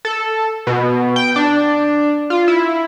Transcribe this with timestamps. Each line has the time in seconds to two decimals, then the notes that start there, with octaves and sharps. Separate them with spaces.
0.05 A4
0.67 B2
1.16 G5
1.36 D4
2.30 F4
2.48 E4